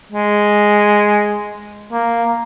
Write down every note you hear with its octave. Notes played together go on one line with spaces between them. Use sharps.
G#3
A#3